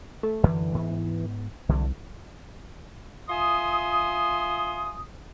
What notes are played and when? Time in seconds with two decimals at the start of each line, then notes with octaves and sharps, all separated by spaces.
0.23 A3
0.44 F#2 D3 E3
0.74 G#2 B3
1.69 C2 D3 E3 F#3
3.29 F4 E5 G#5 C6 D#6